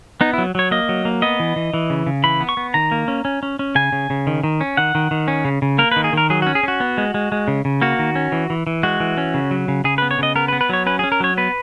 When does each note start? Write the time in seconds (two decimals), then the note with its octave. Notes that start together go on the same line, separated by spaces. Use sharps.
0.21 B3 D#4
0.33 E4
0.38 F#3
0.55 F#3 C#5
0.71 A#3 D#5
0.89 F#3
1.05 A#3
1.22 B3 D#5
1.40 E3
1.56 E3
1.74 E3
1.90 C#3
2.07 C#3
2.24 E3 B5
2.41 B3
2.49 C#6
2.57 B3
2.74 D#3 A#5
2.91 A#3
3.08 C#4
3.25 C#4
3.43 C#4
3.59 C#4
3.75 C#3 G#5
3.92 C#3
4.10 C#3
4.27 D#3
4.43 D#3
4.61 C#4
4.77 D#3 F#5
4.95 D#3
5.11 D#3
5.28 C#4
5.45 C#3
5.62 C#3
5.78 A#3 A#4
5.92 B4
5.96 D#3
6.04 G#4
6.13 D#3 A#4
6.30 F#3 G#4
6.42 F#4
6.47 C#4
6.55 G#4
6.63 C#4 F#4
6.80 B3
6.98 G#3
7.14 G#3
7.32 G#3
7.48 C#3
7.65 C#3
7.82 A#3 F#4
7.99 D#3
8.16 C#4
8.32 E3
8.50 E3
8.67 E3
8.83 G#3 F#4
9.00 E3
9.18 C#4
9.34 C#3
9.51 F#3
9.68 C#3
9.84 C#3 G#4
9.98 B4
10.02 B3
10.11 C#5
10.19 C#3 D#5
10.36 B3 A#4
10.48 B4
10.53 B3
10.61 B4
10.69 F#3 C#5
10.86 C#4 B4
10.99 G#4
11.04 C#4
11.12 A#4
11.20 F#3 C#5
11.37 B3 B4